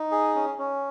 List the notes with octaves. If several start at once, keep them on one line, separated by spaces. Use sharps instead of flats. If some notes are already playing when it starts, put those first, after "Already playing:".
Already playing: D#4
G#4
C#4
C#4